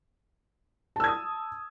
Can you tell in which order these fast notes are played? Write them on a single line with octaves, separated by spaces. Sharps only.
A5 E6 G#6 D#6